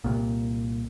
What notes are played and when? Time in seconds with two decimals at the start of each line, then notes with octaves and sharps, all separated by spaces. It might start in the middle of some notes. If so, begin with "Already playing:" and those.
0.04 C2 A#2